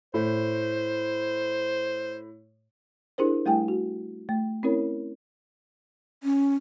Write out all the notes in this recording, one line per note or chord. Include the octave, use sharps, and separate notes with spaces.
A2 C5
D4 E4 G4 G#4 A#4 C5
G3 A3 E4 G4 G5 G#5
F#4
A3
C4 C#4 E4 A#4 C#5
C#4